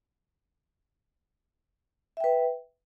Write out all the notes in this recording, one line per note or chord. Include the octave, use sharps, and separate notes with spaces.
B4 E5 G5